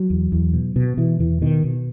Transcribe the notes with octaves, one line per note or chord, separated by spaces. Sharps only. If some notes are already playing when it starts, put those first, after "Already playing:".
Already playing: F#3
E2
E2
B2
B2
B2 E3
E2 E3
B2 D#3
B2